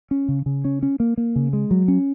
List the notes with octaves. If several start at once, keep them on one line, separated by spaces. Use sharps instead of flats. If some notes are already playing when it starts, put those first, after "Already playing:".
C#4
C#3
C#3
C#4
C#4
A#3
A#3
C#3
G#3
F#3
C#4